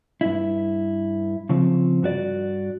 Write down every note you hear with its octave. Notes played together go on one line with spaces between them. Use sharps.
G2 E4
C#3 F3 C4
G2 F#4 D5